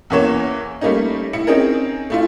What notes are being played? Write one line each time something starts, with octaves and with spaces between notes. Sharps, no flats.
E2 C#3 E3 A#3 C#5 E7
G3 A3 A#3 C#4 D#4
E4 C#7
C4 C#4 D#4 G#4 A#4
A3 E4 F4